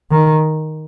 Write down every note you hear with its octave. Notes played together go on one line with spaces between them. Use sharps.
D#3